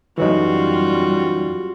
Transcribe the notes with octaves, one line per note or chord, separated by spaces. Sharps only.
F#2 E3 F#3 G3 D#4 F4 F#4